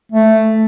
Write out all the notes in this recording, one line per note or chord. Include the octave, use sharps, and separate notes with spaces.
A3